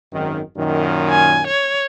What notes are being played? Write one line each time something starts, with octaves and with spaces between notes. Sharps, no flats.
G#1 F#2 D#3
F#2 A#2 D#3
G#5
C#5